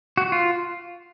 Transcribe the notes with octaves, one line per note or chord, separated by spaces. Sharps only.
F#4
F4